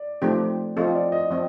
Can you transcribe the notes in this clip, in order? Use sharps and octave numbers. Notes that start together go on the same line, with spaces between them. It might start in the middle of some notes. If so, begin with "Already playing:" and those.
Already playing: D5
F3 A3 C4 D#4 G4
F3 C4 F4 A4 D#5
D5
D#5
F3 C4 D#5